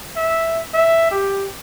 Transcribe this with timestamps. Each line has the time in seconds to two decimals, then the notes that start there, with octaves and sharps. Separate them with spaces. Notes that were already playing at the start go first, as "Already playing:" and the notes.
0.16 E5
0.74 E5
1.11 G4